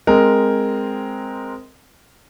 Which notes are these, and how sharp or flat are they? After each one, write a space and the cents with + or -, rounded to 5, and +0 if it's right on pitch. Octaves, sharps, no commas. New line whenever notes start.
G#3 +0 C4 +0 A#4 +0